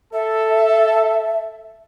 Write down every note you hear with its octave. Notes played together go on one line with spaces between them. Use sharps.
A4 E5